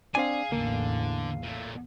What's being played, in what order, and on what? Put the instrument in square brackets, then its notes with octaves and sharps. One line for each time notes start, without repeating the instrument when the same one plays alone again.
[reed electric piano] C4 D4 D5 [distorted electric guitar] G#4 [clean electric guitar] F5 G#5
[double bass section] A1 E2 A2 [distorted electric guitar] D3 [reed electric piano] A#3
[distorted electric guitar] A#2 A3